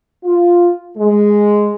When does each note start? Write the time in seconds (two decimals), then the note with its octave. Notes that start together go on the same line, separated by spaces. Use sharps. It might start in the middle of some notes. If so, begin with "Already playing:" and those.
0.24 F4
0.97 G#3